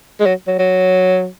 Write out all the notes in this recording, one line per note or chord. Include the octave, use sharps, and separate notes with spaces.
G#3
F#3
F#3
F#3